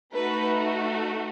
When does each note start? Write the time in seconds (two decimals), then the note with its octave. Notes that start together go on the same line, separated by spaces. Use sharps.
0.14 A3 D#4 F#4 B4